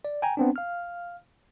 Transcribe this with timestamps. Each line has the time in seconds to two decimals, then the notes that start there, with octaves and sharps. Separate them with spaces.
0.05 D5
0.22 G5 G#5 A#5
0.37 B3 C4 D4
0.56 F5 F6